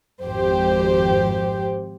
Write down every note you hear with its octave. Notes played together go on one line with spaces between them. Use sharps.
G#1 F2 G4 C5